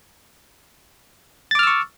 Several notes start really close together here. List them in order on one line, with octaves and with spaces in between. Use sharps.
A6 D6 F6 E6 C#6